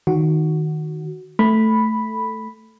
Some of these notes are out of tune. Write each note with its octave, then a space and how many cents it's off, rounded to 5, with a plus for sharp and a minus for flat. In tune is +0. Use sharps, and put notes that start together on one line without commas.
D#3 +0 F#4 +0
A3 +0 B5 +0